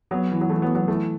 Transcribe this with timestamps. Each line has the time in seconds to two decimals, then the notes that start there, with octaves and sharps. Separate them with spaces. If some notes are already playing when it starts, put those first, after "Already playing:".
0.11 F#3 B3
0.32 E3
0.41 F#3
0.49 E3 A3
0.62 F#3 B3
0.75 F#3 B3
0.88 E3 A3